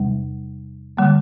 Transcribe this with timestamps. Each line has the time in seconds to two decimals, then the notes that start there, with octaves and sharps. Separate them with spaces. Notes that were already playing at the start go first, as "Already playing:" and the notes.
Already playing: E2 C3 G3
0.97 D3 G3 A#3